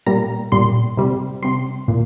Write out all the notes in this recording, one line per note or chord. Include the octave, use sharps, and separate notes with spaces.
A#2 G3 A#5
A#2 G3 C6
C3 G3
C3 G3 C6
A#2